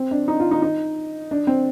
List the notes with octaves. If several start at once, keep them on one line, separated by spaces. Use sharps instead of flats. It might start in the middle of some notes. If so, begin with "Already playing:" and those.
Already playing: C4
D4
D#4
F4
D#4
D#4
D4
C4